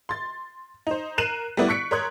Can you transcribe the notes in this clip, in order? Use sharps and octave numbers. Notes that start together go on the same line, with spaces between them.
C6 A6
D#4 C5
A#4 F#6 C7 D#7 E7 F#7
G3 A3 B3 E4 B4 D5
C#6 F#6 B6 C#7 D7
A#4 C#5 C6 D#6 F#6 G#6